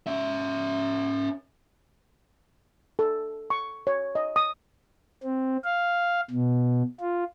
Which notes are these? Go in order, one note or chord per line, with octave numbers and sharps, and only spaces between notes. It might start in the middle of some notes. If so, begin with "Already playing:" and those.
C#4 E5
A4
C#6
C#5
D#5
D#6
C4
F5
B2
F4